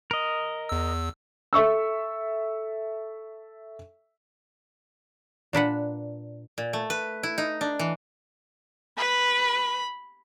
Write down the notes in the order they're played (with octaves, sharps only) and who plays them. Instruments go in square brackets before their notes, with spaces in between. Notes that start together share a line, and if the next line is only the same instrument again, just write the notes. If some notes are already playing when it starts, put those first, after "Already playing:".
[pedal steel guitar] A#4 D#5
[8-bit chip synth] E2 E6
[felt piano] A4 E5 C#6 E6
[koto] A#2 D4 B4 F#5
A#2
A3
B4
E4
D#4
D4
E3
[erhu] B4 [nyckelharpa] B5